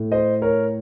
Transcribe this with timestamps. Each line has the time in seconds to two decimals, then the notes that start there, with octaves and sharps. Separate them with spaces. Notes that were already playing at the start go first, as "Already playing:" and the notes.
Already playing: A2 A3
0.12 C5 D#5
0.42 A#4 C#5